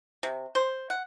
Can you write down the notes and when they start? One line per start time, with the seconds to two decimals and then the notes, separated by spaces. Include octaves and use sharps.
0.23 C3
0.55 C5
0.90 F#5